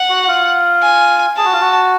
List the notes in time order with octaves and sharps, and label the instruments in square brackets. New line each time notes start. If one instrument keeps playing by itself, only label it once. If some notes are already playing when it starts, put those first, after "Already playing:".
Already playing: [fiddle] F#5
[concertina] F#4
F4
[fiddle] G#5
[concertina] G#4 [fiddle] A5
[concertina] F#4
F4
F#4